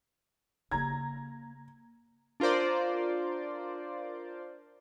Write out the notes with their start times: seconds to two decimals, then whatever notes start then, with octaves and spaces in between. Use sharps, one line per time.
0.72 C#3 A#3 A#5 G#6
2.40 D4 F4 A#4 C5 D5